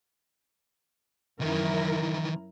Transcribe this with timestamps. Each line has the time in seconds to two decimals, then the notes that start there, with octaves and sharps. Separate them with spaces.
1.41 F#2 D#3 E3 E4 A#4